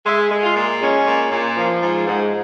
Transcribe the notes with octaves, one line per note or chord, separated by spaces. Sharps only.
G#3 E5
G#3
F4
A#2
G#3 C#4
A#2
A#2
F3
G#2
G#2